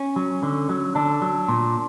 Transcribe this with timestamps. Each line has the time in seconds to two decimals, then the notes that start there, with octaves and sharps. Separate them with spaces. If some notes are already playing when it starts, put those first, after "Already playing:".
Already playing: C#4
0.16 F#3
0.43 D3
0.69 F#3
0.95 D3 D4
1.22 F#3
1.48 A#2